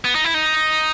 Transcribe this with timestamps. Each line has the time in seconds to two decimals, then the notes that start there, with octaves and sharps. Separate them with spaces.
0.05 B3
0.15 D#4
0.24 E4
0.34 D#4